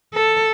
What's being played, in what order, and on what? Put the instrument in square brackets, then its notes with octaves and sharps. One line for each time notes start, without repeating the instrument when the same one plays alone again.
[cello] A4